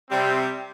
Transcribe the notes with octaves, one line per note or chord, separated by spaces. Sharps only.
C3 G3 C4